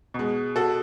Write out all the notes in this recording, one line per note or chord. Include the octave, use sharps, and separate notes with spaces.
B2 G#3
F#4 A4